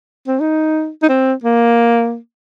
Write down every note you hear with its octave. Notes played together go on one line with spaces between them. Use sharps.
C4
D#4
D#4
C4
A#3